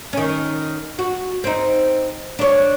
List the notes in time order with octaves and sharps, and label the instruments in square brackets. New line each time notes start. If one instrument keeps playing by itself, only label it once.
[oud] D#3 C#4
F#4
C4 D#4
D4 C#5